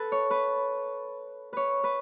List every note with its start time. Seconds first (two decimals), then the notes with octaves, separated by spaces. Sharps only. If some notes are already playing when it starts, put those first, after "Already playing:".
Already playing: A4 B4
0.12 C#5
0.30 B4
1.53 B4 C#5
1.84 B4